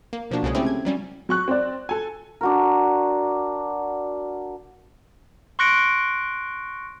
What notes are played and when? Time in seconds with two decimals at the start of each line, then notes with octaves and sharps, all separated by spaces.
0.13 A#3
0.31 B2 F3 A#3 D4 F#4
0.43 C2 C#3 G#3 C#4 G#4
0.55 A3 C4 C#4 E4 G4 A4
0.66 G#6
0.85 F#3 G3 C#4
1.29 F#3 C#6 F#6
1.48 C4 D5
1.89 A4 G#5
2.41 D4 F#4 A#4
5.59 C6 C#6 F#6 A#6 C#7 D7